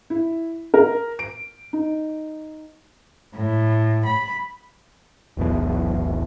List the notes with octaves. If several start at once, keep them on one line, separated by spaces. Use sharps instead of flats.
E4
A#4
D7
D#4
A2
B5
D1 B1 E2 B2